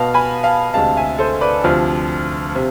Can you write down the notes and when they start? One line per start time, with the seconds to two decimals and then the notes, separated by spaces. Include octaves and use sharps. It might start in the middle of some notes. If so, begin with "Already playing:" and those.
Already playing: B2 B3 F5 A5
0.14 G#5 B5
0.44 F5 A5
0.74 D2 C3 G#3 F5 A5
0.97 E5 G#5
1.19 A4 C5
1.41 B4 D5
1.64 D2 C3 F3 F4
2.55 C3